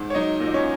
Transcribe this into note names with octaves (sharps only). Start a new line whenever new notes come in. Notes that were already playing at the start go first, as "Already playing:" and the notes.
Already playing: G#2
C#5
F#3 D#4 D#5
A#2
D#5
C#4 C#5